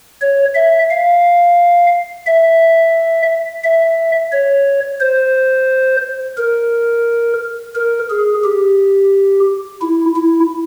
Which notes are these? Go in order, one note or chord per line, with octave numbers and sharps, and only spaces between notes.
C#5
E5
F5
E5
E5
C#5
C5
A#4
A#4
G#4
G4
E4
E4